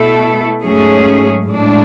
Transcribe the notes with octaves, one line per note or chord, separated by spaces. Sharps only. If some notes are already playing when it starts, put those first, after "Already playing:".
Already playing: B2 A3 E4 A4
G#2 F#3 A3 C#4 G#4
A2 G#3 D4